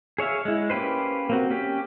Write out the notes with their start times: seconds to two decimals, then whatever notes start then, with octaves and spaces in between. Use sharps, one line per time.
0.19 G#4 C#5 E5 F5
0.45 G#3 E4
0.70 A#3 C#4 G4 B4 C5
1.30 A#3 C4 F#4
1.50 C#4 G4